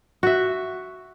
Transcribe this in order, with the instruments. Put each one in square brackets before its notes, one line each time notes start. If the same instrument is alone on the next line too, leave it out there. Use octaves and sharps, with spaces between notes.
[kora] F#4 E5